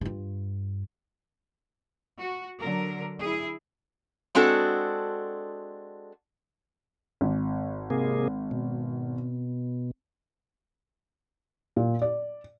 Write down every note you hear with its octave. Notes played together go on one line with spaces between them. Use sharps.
G2 F4
F#4
D3 F#3 A#4
E4 G#4
G#3 C4 D4 F#4 A4
G#1
C3 A#3 G#4
B2
A#2
D5